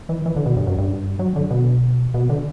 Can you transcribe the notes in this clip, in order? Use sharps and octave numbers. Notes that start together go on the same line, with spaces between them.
E3
E3
D3
B2
G2
F#2
G2
F#3
D3
B2
B2
D3